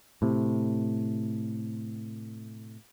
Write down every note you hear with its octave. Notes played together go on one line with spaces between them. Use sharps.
A2 C3